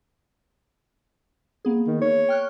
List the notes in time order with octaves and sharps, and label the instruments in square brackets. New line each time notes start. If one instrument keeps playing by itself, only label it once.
[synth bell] A#3 B3 G#4
[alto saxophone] D#3
C#5
[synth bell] G5 F6 F#6